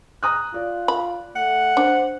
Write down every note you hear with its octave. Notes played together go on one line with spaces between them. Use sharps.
A#5 D#6 F#6
F4 D5
B5
A3 F#5
D4 C5